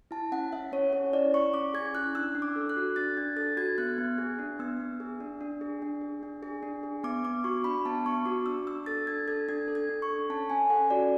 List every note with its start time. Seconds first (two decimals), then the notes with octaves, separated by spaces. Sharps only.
0.11 E4 A5
0.32 C#4 F#5
0.52 C#4 E5
0.72 C#4 C#5
0.93 G#4 C#5
1.13 E4 D5
1.34 C#4 C#6
1.54 C#4 D6
1.74 G#4 G#6
1.95 E4 F#6
2.15 D4 E6
2.35 D4
2.42 D6
2.56 A4
2.69 F#6
2.77 F#4
2.96 D4 A6
3.17 D4 G#6
3.37 A4 A6
3.57 F#4 G#6
3.78 B3 F#6
3.98 B3
4.18 G#4
4.39 D4
4.59 B3 E6
4.80 B3
5.00 G#4
5.20 D4
5.41 D4
5.61 G#4
5.82 D4
6.01 G#4
6.23 D4
6.43 G#4
6.63 D4
6.83 G#4
7.03 B3 D6
7.24 B3 D6
7.44 F#4 C#6
7.64 D4 B5
7.86 B3 A5
8.05 B3 C#6
8.25 F#4 D6
8.46 D4 E6
8.67 D4 E6
8.86 A4 A6
9.07 D4 G#6
9.28 A4 G#6
9.49 D4 G#6
9.68 A4
9.75 G#6
9.89 D4
10.02 C#6
10.09 A4
10.30 C#4 A5
10.50 C#4 G#5
10.70 A4 F#5
10.90 F#4 D5